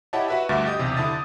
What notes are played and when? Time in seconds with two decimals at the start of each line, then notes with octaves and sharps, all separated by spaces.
0.13 E4 G4 C#5 D#5 F#5 A5
0.28 F#4 B4 E5
0.49 D2 G2 F#4 E5 D6 A6
0.65 G4 D#5 D#6 G6
0.79 B1 E2 C3
0.97 D3 E4 A5 D#6 A6